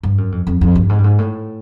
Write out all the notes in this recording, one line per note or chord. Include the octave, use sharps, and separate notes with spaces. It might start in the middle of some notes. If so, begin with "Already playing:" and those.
G2
F#2
F2
F2
F2
G2
G#2
G2
G#2
A2